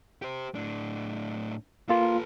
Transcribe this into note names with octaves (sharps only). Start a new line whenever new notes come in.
G4 C5
A2 D4
A#3 F4 A4 B4